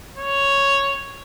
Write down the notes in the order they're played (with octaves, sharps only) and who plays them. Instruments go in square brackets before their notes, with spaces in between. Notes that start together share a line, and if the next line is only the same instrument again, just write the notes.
[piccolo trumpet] C#5